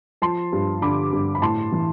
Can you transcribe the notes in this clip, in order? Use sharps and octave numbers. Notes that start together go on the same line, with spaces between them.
F3 A5 C6
G2
D3 B5 D6
G2
B5
A2 A5 C6
E3